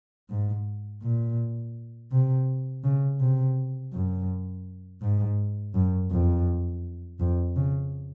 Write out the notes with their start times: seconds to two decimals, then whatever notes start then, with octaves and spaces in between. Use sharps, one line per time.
0.30 G#2
1.03 A#2
2.12 C3
2.84 C#3
3.20 C3
3.93 F#2
5.02 G#2
5.74 F#2
6.11 F2
7.20 F2
7.56 C#3